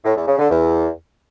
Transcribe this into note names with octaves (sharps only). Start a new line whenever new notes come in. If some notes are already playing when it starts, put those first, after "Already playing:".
A2
E2
C#3
D3
E2